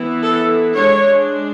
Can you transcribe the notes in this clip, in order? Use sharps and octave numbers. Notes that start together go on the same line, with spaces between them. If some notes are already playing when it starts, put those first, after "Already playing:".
Already playing: E3 B3 E4
A4
G#3 D4 C#5